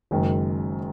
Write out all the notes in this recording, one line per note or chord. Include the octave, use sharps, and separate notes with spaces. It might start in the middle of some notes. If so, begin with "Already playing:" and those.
F#1 F#2 D#3 G#3